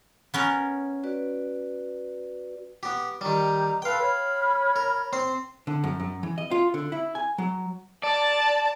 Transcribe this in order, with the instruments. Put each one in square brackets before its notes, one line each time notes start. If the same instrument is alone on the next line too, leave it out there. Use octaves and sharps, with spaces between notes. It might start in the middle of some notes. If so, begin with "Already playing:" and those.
[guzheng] B3 C#4 A#4
[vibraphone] F#4 B4 D5
[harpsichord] B3 G4
[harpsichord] D#3 G3 [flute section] G4 A#5
[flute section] A4 B4 C6 [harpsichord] F5 G5
[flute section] C#5 B5 F6
[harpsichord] A#4
C4 C5
[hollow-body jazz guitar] D3
F#2
F#2
E3
D#5
F4
D3
E4
G#5
F#3
[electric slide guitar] D5 [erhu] A5